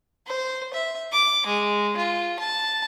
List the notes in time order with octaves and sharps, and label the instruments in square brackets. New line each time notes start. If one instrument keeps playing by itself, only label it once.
[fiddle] C5
E5
D6
G#3
F4
A5